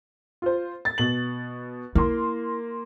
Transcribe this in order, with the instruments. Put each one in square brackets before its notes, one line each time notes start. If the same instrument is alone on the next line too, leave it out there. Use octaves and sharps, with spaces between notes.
[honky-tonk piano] F4 C5
A6
B2 F#7
[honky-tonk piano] A#3 C6 [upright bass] E4